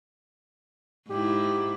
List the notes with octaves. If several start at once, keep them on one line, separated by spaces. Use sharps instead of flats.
G#2 E4 G4